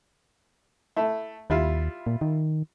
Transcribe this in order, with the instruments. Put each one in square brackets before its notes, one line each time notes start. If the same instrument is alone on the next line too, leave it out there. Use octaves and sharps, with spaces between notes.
[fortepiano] A3 E4
[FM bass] D#2 [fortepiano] G3 E4 F4
[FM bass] A#2
D#3